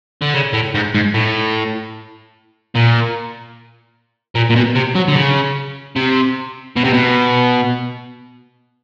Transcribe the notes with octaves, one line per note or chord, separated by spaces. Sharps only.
D3
C#3
A2
G#2
G#2
A2
A#2
A#2
A#2
B2
C3
F#3
D3
C#3
C3
B2
C3
B2